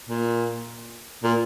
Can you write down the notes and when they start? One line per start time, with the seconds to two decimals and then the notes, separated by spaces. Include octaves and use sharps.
0.09 A#2
1.24 A#2